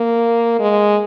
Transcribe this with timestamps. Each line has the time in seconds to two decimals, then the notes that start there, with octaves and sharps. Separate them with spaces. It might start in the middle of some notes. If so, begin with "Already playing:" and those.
Already playing: A#3
0.59 G#3